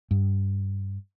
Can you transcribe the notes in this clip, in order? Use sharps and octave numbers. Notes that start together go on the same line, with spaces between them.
G2